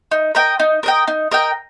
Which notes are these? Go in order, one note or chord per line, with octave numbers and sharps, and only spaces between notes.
D#4
A#4 D#5 G5
D#4
A#4 D#5 G5
D#4
A#4 D#5 G5